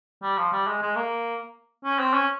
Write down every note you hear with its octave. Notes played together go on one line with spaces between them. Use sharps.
G3
F3
G3
G#3
G#3
A#3
C#4
C4
C#4